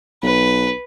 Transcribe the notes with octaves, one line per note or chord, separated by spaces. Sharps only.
B1 B4